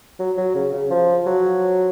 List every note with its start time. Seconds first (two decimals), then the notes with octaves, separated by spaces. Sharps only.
0.19 F#3
0.37 F#3
0.55 C#3
0.73 C#3
0.90 F3
1.26 F#3